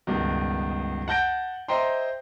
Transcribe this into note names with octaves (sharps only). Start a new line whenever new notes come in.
C#2 G2 B2 D#3
F#5 A5 G6 A#6 D7
C5 D#5 E5 G5 A#5 C6